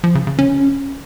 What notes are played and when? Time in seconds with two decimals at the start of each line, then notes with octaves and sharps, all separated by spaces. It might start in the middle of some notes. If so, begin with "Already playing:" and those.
0.04 F3
0.15 C#3
0.27 C#3
0.39 C#4